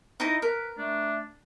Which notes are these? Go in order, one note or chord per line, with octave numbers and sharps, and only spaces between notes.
D#4 E4 D#5
A#4 B4
A3 D4